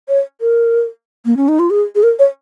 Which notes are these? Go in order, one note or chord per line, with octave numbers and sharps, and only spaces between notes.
C#5
A#4
A#3
C#4
D#4
F4
G#4
G#4
A#4
C#5